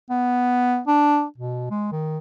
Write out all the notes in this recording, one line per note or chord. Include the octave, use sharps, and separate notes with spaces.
B3
D4
B2
G#3
D#3